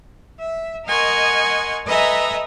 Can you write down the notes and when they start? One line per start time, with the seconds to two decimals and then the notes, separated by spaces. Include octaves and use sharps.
0.39 E5
0.86 A#4 D#5 F#5 G#5 C6 C#6
1.85 A4 B4 D#5 E5 G#5 A#5